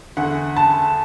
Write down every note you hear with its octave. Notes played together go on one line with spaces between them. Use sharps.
E2 D3 F#5
A5